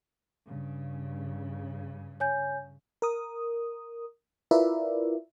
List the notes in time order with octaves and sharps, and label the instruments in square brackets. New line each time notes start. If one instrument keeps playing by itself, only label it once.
[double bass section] G2 C#3
[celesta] C#5 G#5 G6
[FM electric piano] A#4 D#6
E4 F4 A#4 B4 D5 E5